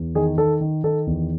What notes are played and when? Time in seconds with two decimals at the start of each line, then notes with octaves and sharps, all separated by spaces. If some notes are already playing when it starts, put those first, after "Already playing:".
Already playing: E2
0.15 D#3 G#4
0.38 D#3 A4
0.61 D#3
0.84 D#3 A4
1.07 E2